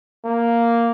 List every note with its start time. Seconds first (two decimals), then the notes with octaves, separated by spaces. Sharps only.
0.25 A#3